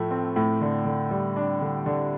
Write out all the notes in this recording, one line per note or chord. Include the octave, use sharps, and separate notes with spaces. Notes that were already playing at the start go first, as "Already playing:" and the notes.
Already playing: A2 F3 A3
C4
A2
D3
D3
G3
D4
D3
D3